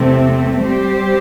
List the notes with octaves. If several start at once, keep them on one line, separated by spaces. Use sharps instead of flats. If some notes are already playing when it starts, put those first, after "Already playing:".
Already playing: E2 C3 A3 C4
G3 C4 G4 C5